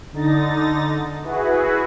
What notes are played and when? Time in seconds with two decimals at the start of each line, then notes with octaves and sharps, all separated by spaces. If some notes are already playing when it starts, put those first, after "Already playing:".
0.13 D3 D#4 A6 A#6
1.23 E4 F#4 G#4 B4